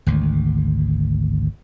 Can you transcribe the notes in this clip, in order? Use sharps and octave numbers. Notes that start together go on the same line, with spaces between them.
G#1 D2